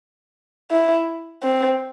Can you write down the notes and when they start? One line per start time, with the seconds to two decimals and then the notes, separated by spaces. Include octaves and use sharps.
0.71 E4
1.43 C4